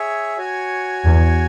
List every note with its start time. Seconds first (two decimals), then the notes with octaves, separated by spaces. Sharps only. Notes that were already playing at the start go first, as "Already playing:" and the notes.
Already playing: G#4 C#5 E5
0.38 F#4 C#5 G#5
1.05 E2